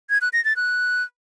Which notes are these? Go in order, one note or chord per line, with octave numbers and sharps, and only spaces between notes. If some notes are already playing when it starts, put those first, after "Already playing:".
G#6
F#6
A#6
A6
F#6